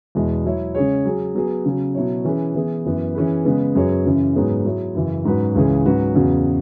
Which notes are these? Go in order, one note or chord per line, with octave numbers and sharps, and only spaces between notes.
E2 B2 G#3 E4
F#3 E4 C#5
C#3 G#3 C#4 G#4 C#5
F#3 C#4 G#4
F#3 B3 G#4
C#3 F#3 C#4
B2 F#3 E4 C#5
E3 C#4 G#4 B4
E3 B3 G#4
F#2 E3 B3
E3 C#4 G#4 B4
C#3 G#3 B3
F#2 F#3 B3 G#4 C#5
F#2 C#3 E3 C#4
G#2 F#3 B3 G#4 C#5
F#3 E4 G#4 C#5
F#2 C#3 E3
G#2 F#3 C#4 F#4 B4
C#2 C#3 E3 C#4 G#4
G#2 F#3 C#4 F#4 B4
E2 C#3 F#3 B3 F#4